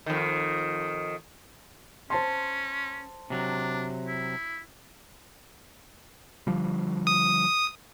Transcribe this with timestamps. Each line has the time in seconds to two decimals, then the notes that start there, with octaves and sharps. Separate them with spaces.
0.06 F2 D#3
2.10 C#4 C5 A5 C6
3.30 C3 F#3 D4
4.07 E4
6.47 D3 F3 G3
7.07 D#6